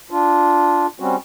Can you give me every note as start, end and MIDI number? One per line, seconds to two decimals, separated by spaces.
0.11 0.87 62
0.11 0.87 65
1.00 1.16 55
1.00 1.16 60
1.00 1.16 61
1.00 1.16 66